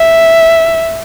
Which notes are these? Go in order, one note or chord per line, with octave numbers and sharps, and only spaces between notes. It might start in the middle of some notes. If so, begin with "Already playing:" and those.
Already playing: E5